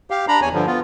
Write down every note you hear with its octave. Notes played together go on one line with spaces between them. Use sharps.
G4 F5
D4 A#5 B5
E2 C#5 G#5
G2 D3 F3
B3 F4